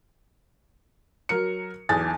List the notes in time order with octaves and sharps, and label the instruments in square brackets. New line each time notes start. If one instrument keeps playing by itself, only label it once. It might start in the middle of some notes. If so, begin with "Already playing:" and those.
[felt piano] F#3 A#4 C#7
B1 E2 G#5 D#6 A6